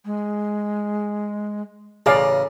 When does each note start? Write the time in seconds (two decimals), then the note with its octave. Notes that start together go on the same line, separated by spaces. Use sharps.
0.06 G#3
2.06 A1 C#3 G#4 D5 F5 A#5